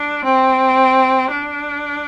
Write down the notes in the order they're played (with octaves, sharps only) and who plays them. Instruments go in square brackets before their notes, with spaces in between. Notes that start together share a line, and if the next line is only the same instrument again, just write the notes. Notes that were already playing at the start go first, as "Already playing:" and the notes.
Already playing: [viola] D4
C4
D4